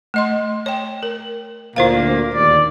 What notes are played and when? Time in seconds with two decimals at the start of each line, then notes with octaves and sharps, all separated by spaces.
0.14 A3 D#5 C6
0.66 C#5 G5
1.03 A#4
1.76 D2 A#2 A#3 E4 C5 F5
2.34 D#2 D5